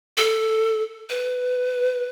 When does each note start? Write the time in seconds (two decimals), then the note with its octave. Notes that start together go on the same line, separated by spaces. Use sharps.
0.17 A4
1.09 B4